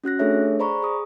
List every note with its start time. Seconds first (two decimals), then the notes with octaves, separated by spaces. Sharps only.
0.04 C#4 F#4 F#6 A#6
0.19 A3 D4 G#4 A4 C#5 E5
0.59 G#4 C5 D5 A#5 B5 C#6
0.83 G#4 D#6